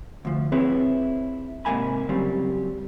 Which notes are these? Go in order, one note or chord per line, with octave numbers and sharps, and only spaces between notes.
D2 F3
C4 E4 G#4 B4 C#5
G#2 C3 A#3 G#5 B5
C#3 F#3 G3 C4